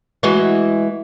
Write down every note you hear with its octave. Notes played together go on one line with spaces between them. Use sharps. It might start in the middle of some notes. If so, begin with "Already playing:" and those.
E3 G#3 F#4